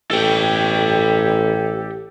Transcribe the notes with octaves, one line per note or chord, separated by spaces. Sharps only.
A1 G4 A4 G5